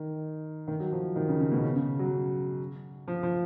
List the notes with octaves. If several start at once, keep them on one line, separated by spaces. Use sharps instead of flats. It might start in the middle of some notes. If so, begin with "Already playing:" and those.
Already playing: D#3
D#3
F#3
F3
D#3
C#3
C#3
B2
C#3
C#3
F#3
F3
F3